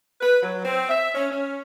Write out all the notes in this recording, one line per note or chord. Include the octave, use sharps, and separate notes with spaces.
B4
F#3
C4
E5
C#4
C#4